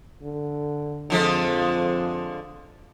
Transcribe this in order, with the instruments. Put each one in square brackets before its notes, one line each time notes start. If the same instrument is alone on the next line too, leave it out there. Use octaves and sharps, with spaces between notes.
[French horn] D3
[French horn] F2 [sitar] D3 F3 G#3